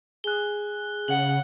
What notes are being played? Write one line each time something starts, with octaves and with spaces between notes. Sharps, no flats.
G#4 F#6 G7
C#3 F#5 F#7